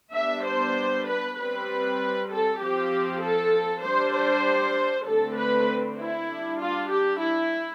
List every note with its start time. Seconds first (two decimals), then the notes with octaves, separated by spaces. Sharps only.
0.14 G3 B3 D4 E5
0.45 C5
1.07 B4
1.37 G3 C4 B4
2.30 A4
2.60 F3 C4 G4
3.22 A4
3.83 G3 D4 C5
4.14 C5
5.06 D3 A3 C4 A4
5.37 B4
5.99 E4
6.29 G3 D4
6.60 F4
6.91 G4
7.22 E4